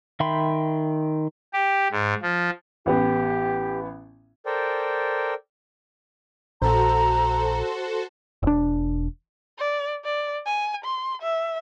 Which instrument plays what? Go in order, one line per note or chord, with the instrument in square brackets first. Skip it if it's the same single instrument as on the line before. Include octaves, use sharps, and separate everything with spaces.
[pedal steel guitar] D#3 E5 G5 B5 C6
[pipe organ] G4
G#2
F3
[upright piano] A1 B3 [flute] G4
[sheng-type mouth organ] A4 A#4 C5 D5 G5
[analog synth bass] A#1 [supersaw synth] F#4 A4 C5 [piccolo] A#5
[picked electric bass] E1 D4
[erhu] D5
D5
G#5
C6
E5